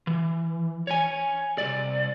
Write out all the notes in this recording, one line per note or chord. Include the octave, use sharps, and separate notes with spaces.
E3
C#5 G#5
C2 D5